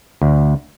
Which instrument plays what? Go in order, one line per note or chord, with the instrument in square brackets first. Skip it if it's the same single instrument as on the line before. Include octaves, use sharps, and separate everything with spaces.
[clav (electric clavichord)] D2